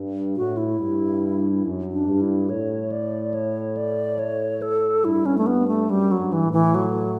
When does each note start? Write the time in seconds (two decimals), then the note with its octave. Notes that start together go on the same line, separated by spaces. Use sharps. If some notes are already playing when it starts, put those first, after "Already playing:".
Already playing: G2
0.37 A2 F#4
0.57 E4
0.78 G2
1.64 F#2
1.92 D4
2.06 G2
2.21 E4
2.49 A2 C#5
2.92 D5
3.34 C#5
3.77 D5
4.19 C#5
4.62 A4
5.04 G2 E4
5.26 C#4
5.38 A3
5.47 B3
5.68 A3
5.90 F#2 G3
6.11 F#3
6.18 G2
6.33 E3
6.46 A2
6.53 E3
6.75 F#3